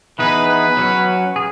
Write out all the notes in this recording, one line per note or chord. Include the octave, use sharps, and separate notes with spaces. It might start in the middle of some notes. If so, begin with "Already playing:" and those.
E3 B3 D#4 G#4 B4
B4
F#3 C#4 F#4
G#4